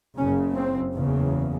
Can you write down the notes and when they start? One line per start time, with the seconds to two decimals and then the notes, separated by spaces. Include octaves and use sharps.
0.17 F#1 F#2 C#3 C#4
0.55 C4
0.94 F#1 E2 C#3